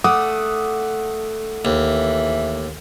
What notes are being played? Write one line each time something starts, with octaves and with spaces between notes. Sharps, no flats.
A3 F#5 D6 D#6
D#2 E3